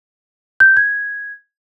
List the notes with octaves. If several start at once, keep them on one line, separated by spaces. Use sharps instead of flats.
G6
G#6